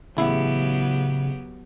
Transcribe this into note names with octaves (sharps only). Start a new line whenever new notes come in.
A1 C#3 F#3 B3 E4 G4